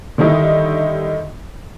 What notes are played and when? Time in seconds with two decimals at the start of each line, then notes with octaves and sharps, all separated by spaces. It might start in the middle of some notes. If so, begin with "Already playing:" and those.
0.18 D3 D#3 G3 D#4 E4